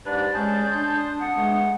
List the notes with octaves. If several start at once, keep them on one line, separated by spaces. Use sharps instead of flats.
G#2 D4 G4 B4 D5
G#3 C#4 G#4 A5 G6
D4 A5 C6
D#6
F2 F#5
G#3 A3 B3